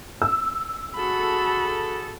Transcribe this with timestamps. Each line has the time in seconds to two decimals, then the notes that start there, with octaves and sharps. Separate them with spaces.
0.22 E6
0.96 F#4 G#4 A4 B5